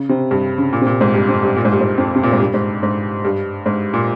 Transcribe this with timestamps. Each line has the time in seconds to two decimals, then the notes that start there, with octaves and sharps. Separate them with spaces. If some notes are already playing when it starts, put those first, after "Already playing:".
Already playing: C#3
0.09 C3
0.31 G2
0.58 C#3
0.73 A#2
0.81 C3
0.87 A#2
1.01 G#2
1.14 G2
1.29 F2
1.43 G2
1.56 A#2
1.65 G#2
1.73 G2
1.81 G#2
1.98 F2
2.16 C3
2.23 A#2
2.32 G#2
2.40 G2
2.54 G#2
2.83 G#2
3.25 G2
3.66 G#2
3.93 A#2